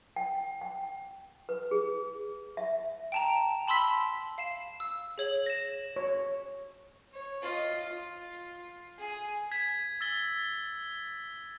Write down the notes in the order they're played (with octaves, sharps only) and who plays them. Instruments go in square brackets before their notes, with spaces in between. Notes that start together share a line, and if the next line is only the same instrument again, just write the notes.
[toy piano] G5
G5
B4
G#4
E5
[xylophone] G5 A5 A#5
A5 B5 C6 E6 B6
F5 C7 E7
E6
G#4 C#5 F#7
A#6 E7
[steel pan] C#5
[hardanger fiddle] C#5
F4 D#5
F4
G#4
[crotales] G#6 B6
E6 A6 G7